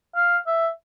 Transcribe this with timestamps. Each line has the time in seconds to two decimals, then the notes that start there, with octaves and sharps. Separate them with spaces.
0.16 F5
0.47 E5